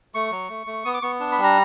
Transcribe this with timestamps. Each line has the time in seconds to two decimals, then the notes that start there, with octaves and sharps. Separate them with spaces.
0.14 A3 C#6
0.32 F#3
0.49 A3
0.67 A3
0.85 B3 D#6
0.94 D6
1.02 B3 C#6
1.20 D4
1.32 B5
1.39 G3 A#5